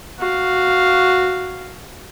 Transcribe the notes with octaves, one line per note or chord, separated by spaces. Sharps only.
F#4 F5